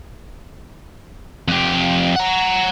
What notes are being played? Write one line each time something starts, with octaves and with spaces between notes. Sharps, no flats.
F2 G4
F#5 A#5